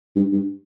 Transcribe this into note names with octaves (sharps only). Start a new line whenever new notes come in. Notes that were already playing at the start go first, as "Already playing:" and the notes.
G2
G2